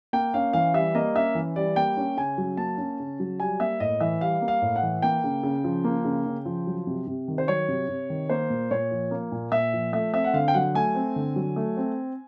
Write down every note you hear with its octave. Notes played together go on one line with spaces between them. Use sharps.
A#3 G5
C#4 F5
E3 F5
G3 E5
A#3 D#5
C#4 E5
E3
G3 D5
A#3 G5
C#4
C#3 G#5
F#3
A#3 A5
C#4
C#3
F#3
G3 G#5
A#3 E5
A2 D#5
E3 E5
G3 F5
A#3
F5
A2
F#5
E3
A#3 G5
C#3
C#3
F3
A#3
C#3
C#3
F3
F#3
C3
C3
D#3
C5
F#3 C#5
C3
C3
D#3
A#3 C5
A#2
A#2 C#5
F3
A#3
A#2
A#2 E5
F3
A3 E5
C4 E5
F#5
D3 F5
G5
F#3 F#5
A3 G#5
C4
D3
F#3
A3
C4